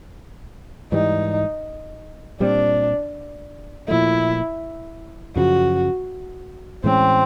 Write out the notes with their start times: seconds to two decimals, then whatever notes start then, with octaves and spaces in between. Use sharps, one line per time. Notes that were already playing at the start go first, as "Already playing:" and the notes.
0.92 G#2 E3 G3 D#4
2.40 A#2 G3 C4 D4
3.88 A#2 F3 A3 E4
5.36 F#2 C#3 F3 F#4
6.84 A2 E3 G#3 C4 C#4